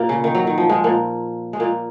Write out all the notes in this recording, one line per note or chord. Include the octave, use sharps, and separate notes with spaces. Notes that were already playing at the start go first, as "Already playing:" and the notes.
Already playing: A#2 A#3
C#3
D#3
F#3
D#3
F3
G#2 G#3
A#2 A#3
G#3
A#2 A#3